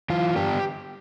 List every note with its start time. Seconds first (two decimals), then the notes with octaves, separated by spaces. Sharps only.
0.10 E3 F4
0.36 G3 B3 D4 G4